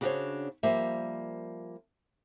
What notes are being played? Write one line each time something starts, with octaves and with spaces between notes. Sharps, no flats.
C#3 D4 F#4 G4 C5 C#5
F3 G3 A#3 C5 E5